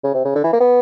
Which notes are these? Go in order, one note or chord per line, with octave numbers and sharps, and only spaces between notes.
C#3
C3
C#3
D3
E3
A#3
B3